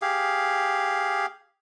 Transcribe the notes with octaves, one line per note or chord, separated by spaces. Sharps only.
G4 G#4 F5